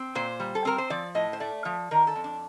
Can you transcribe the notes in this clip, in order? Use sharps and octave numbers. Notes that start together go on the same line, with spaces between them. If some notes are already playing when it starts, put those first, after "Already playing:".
Already playing: C4
A#2 C5
G3
A4
C4 A#4
C5
F3 D5
A2 D#5
C5
A3 D5
F3
D#3 A#4
A4
F2
D4